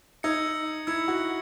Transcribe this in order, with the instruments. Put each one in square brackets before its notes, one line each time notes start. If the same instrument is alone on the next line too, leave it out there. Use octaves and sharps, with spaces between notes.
[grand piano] D#4 [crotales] E6 G#6 C#7
[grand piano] E4 [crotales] E6 G#6 C#7
[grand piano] F#4